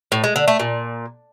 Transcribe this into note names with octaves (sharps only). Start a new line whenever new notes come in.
A2
G#3
D3
A3
A#2